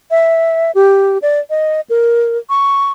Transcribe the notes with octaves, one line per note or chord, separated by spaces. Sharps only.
E5
G4
D5
D#5
A#4
C#6